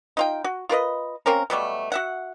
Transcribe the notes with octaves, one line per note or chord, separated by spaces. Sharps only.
D#4 F4 G5
F#4
F4 A#4 B4 D#5
A#3 C4 C#4 A#4
B2 F#3 G3 A3
F#4 E5 F#5